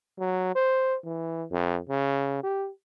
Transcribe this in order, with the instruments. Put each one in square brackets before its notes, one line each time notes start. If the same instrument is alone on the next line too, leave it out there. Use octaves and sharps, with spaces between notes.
[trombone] F#3
C5
E3
F2
C#3
G4